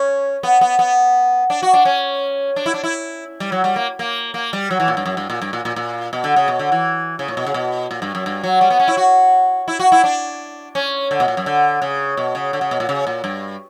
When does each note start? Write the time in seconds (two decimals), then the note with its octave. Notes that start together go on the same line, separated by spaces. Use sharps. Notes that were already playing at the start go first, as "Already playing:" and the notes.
Already playing: C#4
0.43 B3
0.61 B3
0.79 B3
1.50 D4
1.62 F#4
1.74 D4
1.85 C#4
2.56 D4
2.66 E4
2.74 D4
2.84 E4
3.40 G3
3.52 F#3
3.64 G3
3.76 A#3
3.99 A#3
4.34 A#3
4.53 G3
4.71 F#3
4.80 E3
4.88 A#2
4.97 G2
5.06 F#2
5.17 G2
5.30 A#2
5.42 G2
5.53 A#2
5.65 A#2
5.76 A#2
6.13 B2
6.24 D3
6.36 C#3
6.48 B2
6.59 D3
6.72 E3
7.19 C#3
7.28 A#2
7.37 B2
7.47 C#3
7.54 B2
7.91 A#2
8.02 G2
8.15 F#2
8.26 G2
8.44 F#3
8.61 G3
8.70 B3
8.80 C#4
8.88 E4
8.97 F#4
9.68 E4
9.80 F#4
9.92 E4
10.04 D4
10.75 C#4
11.11 D3
11.20 B2
11.28 A#2
11.37 F#2
11.46 D3
11.82 C#3
12.17 B2
12.35 C#3
12.53 D3
12.61 C#3
12.71 B2
12.80 A#2
12.89 C#3
13.07 A#2
13.24 G2